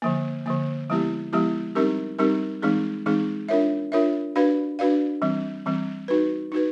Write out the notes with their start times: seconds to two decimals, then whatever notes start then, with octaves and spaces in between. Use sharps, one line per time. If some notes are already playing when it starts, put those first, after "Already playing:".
0.02 D3 F3 A#3
0.46 D3 F3 A#3
0.90 F3 G#3 B3 E4 G4
1.33 F3 G#3 B3 E4 G4
1.75 G3 C4 D#4 G4 A#4
2.19 G3 C4 D#4 G4 A#4
2.62 E3 G#3 C4 D#4 G#4
3.06 E3 G#3 C4 D#4 G#4
3.49 D4 F4 A#4 C#5 E5
3.92 D4 F4 A#4 C#5 E5
4.36 D4 F#4 B4 D5 F5
4.79 D4 F#4 B4 D5 F5
5.22 E3 G3 C4
5.66 E3 G3 C4
6.08 D#4 F#4 B4
6.52 D#4 F#4 B4